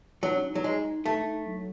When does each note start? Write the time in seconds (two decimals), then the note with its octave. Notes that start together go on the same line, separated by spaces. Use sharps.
0.23 F#3 D#4
0.36 C#4
0.50 D#4
0.55 F#3
0.64 G#3
1.04 A3 D#4
1.25 D#4
1.46 F#3